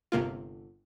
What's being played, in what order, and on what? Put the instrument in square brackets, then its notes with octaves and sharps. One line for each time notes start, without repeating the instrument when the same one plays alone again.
[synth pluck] G1 C3 A#3 F4